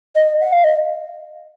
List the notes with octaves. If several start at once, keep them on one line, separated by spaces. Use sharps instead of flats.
D#5
F#5
F5
D#5